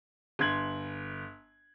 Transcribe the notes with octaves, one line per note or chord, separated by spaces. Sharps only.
G1 C6 G#6 F#7